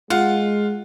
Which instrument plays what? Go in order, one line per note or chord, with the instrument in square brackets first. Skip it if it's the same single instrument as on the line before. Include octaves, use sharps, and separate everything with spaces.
[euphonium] G#3 [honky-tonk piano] F4 [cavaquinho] F#5